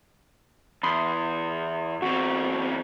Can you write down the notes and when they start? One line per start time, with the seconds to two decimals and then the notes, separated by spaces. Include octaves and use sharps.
0.83 E2 B5 C6 D#6
2.02 E2 C4 F#4